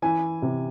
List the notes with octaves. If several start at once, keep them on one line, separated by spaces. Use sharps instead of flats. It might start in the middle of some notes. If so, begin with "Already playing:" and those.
E3 G#5
C3